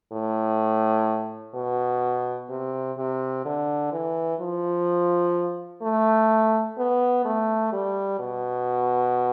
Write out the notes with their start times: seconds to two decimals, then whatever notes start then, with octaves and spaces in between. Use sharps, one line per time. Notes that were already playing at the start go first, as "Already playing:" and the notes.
0.12 A2
1.55 B2
2.50 C3
2.98 C3
3.45 D3
3.92 E3
4.40 F3
5.82 A3
6.78 B3
7.25 A3
7.72 G3
8.19 B2